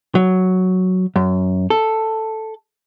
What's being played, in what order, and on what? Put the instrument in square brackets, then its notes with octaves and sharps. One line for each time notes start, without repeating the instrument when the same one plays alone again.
[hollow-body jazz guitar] F#3
F#2
A4